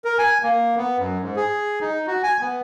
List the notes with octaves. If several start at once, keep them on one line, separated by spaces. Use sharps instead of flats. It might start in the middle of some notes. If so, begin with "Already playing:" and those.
A#4
G#5
A#3
B3
F#2
G#2
G#4
D#4
F#4
G#5
B3